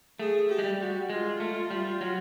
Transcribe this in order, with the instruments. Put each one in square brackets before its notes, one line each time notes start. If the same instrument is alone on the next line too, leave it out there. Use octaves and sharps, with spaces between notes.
[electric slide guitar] A3 [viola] G#4
[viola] G4
[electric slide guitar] G#3
G3
[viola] F#4
[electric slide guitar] G#3 [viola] F4
[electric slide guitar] A3
G3
F#3